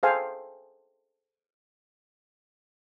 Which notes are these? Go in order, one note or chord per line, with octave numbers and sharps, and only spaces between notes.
G#4 A4 C5 F5 G5 G#5